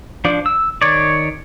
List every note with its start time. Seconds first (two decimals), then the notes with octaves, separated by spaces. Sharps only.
0.25 F3 D4
0.46 E6
0.82 D#3 C#5 D5